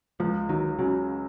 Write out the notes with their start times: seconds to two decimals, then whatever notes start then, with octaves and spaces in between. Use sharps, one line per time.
0.20 C#2 F3
0.49 D#3 F#3
0.79 C#3 F#3